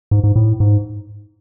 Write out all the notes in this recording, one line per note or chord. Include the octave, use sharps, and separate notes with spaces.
G#2
G#2
A2
G#2